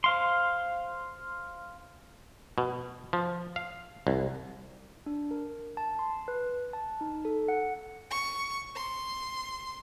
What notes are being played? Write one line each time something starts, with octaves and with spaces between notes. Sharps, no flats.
C5 F5 C6
B2
F3
F5
C2
D4
A#4
A5
C6
B4
A5
D#4
A4
F#5
C#6
C6